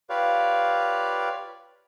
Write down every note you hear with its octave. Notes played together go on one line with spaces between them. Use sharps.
F4 G4 B4 C#5 D5 F5